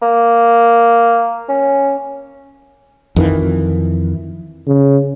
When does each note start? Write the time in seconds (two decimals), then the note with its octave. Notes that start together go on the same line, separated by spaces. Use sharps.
0.02 A#3
1.49 C#4
3.16 F2 D#3 E3
4.67 C#3